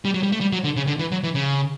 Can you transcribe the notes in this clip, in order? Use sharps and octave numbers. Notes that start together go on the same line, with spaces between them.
G3
F#3
G3
A3
G3
F#3
D3
C#3
D3
E3
F#3
E3
C#3